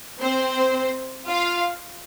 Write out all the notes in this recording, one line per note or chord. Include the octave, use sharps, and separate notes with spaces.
C4 C5
F4 F5